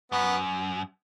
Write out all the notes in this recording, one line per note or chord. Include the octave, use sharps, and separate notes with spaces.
F#2 B3